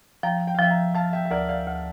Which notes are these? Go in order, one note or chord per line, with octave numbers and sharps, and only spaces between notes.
F3 G5 A#5
G5
F5
F3 E5 G5
G5 A#5
F3 F5 A5
E5 G5
E5
D2 A#4 D5
D5 F5
D2